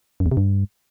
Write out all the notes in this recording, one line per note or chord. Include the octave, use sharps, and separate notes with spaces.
F#2
E2
C3
G2